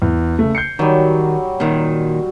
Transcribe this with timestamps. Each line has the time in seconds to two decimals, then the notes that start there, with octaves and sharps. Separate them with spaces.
0.02 E2
0.39 C#3 A3
0.55 G6 C7 C#7
0.79 D#3 F#3 G3
1.60 A#2 D#3